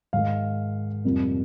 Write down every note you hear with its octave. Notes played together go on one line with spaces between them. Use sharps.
G#2 D#3 G#3 F5
F2 C3 G3 A#3